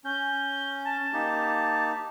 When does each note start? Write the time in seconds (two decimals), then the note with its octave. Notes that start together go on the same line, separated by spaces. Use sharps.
0.05 C#4 G6
0.85 A5
1.13 A#3 D#4 G4